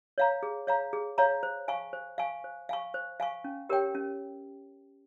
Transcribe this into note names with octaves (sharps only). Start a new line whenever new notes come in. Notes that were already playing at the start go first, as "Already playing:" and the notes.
C#5 F5 A#5
G#4
C#5 F5 A#5
G#4
C#5 F5 A#5
C5
F5 G#5 C#6
C5
F5 G#5 C#6
C5
F5 G#5 C#6
C5
F5 G#5 C#6
C#4
G4 A#4 C#5 G5
C#4